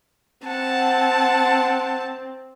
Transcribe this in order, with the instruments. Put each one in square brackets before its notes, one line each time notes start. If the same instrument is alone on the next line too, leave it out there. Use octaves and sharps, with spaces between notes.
[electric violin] C4 [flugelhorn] F#5 [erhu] A5